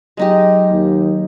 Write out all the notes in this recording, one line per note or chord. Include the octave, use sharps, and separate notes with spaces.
F#3 G#3 D#4 G4
D#2